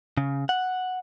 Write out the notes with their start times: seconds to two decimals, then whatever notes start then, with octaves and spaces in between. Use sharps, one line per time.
0.17 C#3
0.49 F#5